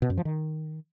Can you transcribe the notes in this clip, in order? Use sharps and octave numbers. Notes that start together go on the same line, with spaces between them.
B2
F#2
F3
D#3